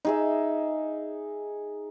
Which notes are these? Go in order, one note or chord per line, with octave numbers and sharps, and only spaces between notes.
D#4 G#4 E5